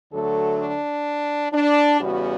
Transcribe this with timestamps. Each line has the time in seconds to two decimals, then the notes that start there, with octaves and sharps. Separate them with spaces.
0.12 D2 D3 F#3 A3 A4
0.59 D4
1.53 D4
2.00 E2 C#3 G3 B3 F#4